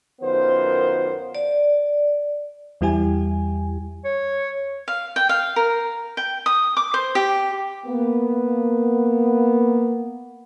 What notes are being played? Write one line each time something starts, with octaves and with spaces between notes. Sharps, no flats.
F#2 D#3 B3 F4 C5
D5
E2 G3 E4 G4 G#5
C#5
F5
G5
F5
A#4
G5
D#6
D6
C5
G4
A#3 B3